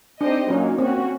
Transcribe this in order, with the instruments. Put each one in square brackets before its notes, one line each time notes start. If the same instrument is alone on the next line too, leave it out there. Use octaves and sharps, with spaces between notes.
[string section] C4 D#4 G4 C5 D#5 [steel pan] D4
[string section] A#2 F#3 A#3 D#4 [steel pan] C#4
[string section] A#3 C#4 F#4 [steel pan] C4